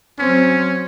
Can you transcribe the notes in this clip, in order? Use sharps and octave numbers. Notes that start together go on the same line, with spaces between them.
F#3 C4 C#4